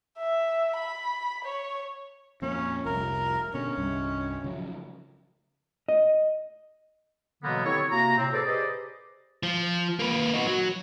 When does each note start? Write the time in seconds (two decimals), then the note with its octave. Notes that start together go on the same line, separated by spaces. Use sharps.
0.19 E5
0.76 B5
1.45 C#5
2.42 F2 A#2 C#4
2.86 F1 C2 A#4
3.54 B2 D3 C#4
3.77 C2 G2
4.44 C#3 F3 F#3
5.88 D#5
7.42 B2 D3 E3 F#3 A#3 B3
7.64 C4 E4 G4 A4 C#5
7.91 C3 A#3 F#4 A#5
8.17 A2 C3 C4
8.32 G#4 A4 B4 C5 D5
8.46 G4 G#4 B4 C5 D5 D#5
9.43 F3
9.99 A#3 B4
10.34 D#4 F#4
10.46 F#3